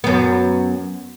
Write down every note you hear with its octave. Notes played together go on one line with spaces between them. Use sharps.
F#2 B3